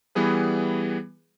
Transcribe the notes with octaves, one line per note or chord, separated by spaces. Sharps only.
E3 G3 B3 G#4 B4